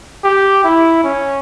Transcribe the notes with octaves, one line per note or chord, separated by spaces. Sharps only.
G4
E4
C#4